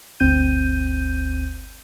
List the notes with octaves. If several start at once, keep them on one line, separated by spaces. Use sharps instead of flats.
G1 D2 C4 G6 D#7